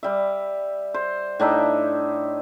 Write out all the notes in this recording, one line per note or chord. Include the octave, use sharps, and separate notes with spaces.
G3 E5
C5
A2 D4 D#4 E5